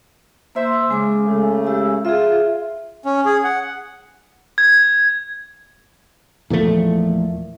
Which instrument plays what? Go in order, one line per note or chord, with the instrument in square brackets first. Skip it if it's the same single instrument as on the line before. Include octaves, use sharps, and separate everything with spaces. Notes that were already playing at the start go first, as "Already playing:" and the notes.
[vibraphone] A#3 C6 E6 [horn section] C5 E5
[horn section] C#3 [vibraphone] G#3 G#5 D6
[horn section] C#3 A3
[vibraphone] G#3 G4 E6
[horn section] F4 [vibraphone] G#4 E5
[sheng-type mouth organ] C#4
G#4
F#5
[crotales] G#6
[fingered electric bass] E2 A#2 F3 A3